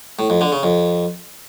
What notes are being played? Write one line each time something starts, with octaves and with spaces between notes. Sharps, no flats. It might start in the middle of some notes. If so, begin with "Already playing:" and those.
A2
F2
D3
C#3
F2